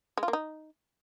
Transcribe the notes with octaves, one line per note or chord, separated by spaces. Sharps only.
G#3
F4
A#3
D#4